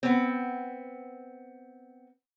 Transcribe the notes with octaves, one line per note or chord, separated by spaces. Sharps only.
B3 C4